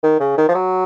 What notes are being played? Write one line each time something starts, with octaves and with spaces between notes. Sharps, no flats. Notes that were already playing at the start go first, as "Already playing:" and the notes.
D#3
C#3
D#3
F3
F#3